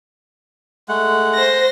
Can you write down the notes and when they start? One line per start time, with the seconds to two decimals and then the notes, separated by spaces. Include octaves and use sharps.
0.88 G#3 A3 F#5
1.35 C5 A#6